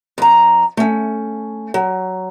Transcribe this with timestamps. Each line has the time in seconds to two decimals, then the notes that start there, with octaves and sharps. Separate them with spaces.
0.18 F2 A#5
0.77 A3 C#4
1.74 F#3